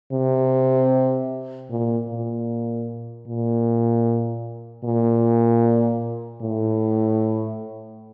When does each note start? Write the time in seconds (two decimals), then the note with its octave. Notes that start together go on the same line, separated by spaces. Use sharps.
0.12 C3
1.70 A#2
2.09 A#2
3.27 A#2
4.84 A#2
6.41 A2